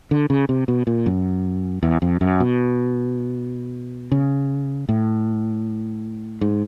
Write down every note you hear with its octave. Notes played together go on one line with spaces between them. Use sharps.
D3
C#3
C3
B2
A#2
F#2
E2
F2
F#2
B2
C#3
A2
G#2